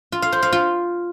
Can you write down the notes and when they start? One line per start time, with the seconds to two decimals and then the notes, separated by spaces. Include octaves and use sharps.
0.12 F4
0.22 F5
0.32 C5
0.42 F5
0.53 F4